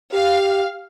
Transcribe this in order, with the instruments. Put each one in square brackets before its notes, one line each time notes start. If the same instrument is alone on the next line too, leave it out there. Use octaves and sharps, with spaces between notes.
[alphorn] G4 [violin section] F5